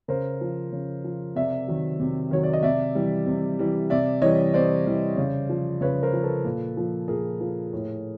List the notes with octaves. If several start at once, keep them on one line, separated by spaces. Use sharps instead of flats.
C#3 A#4 C5
F3
C#3
F3
C3 D5 E5
D#3 F#3
C3
D#3 F#3 C#5
D5
D#5
C3 D5 E5
E3 G3
C3
E3 G3
C3 D5 E5
E3 G3 C#5 D#5
C3 C5 D5
E3 G3
C#3
F3
C#3 B4 C#5
A#4 C5
F3
A4 B4
A#2
F3
A#2 G#4 A#4
F3
A2